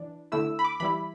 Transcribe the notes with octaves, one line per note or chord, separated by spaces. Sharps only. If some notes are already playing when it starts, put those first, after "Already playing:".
Already playing: E3 D4
D3 A3 E4 E6
B5
D6
E3 G3 E4 B5